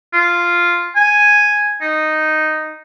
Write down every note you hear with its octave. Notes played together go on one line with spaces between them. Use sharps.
F4
G#5
D#4